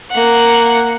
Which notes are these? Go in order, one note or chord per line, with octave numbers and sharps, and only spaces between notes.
A#3 F#5